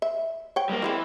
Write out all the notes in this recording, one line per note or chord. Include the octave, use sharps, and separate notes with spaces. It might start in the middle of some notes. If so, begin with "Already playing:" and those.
E5
C#5 G5
G3 A#3
E3 G3 G#3 C4